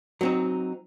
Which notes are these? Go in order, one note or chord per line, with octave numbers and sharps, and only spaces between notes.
F#3 C4 D#4